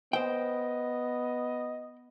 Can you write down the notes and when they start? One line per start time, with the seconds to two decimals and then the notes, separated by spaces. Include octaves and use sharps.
0.13 B3 C5 D#5 G5